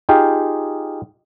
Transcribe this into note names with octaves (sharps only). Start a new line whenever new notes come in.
D#4 F4 G4 G#4 F5 G5